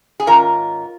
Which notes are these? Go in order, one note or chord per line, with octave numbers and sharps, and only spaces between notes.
G#4
G#2 D#3 C#4 F4 A#4